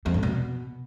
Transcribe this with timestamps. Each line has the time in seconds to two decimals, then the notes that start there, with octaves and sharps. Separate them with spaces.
0.06 F2
0.14 G2
0.23 B2